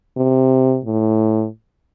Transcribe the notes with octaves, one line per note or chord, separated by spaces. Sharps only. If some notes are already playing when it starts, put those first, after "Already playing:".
C3
A2